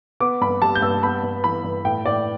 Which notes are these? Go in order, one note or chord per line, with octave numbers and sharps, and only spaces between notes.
B3 D6
G2 B5
G3 A5
G6
G2 E6
B3 B5
G2
E3 B5
G2
A2 G5
A2 D5